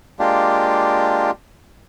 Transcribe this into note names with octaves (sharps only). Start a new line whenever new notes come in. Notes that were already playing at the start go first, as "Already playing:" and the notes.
G#3 A#3 D4 F4 G4